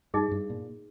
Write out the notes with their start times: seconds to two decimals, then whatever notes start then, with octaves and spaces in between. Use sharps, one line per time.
0.14 G2 D#4 G#4 D#5
0.31 G2
0.50 A#2